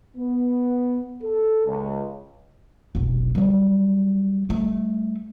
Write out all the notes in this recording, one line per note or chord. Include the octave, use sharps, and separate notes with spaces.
B3
A4
C#2
F1 B1
F#3 G3
G3 A3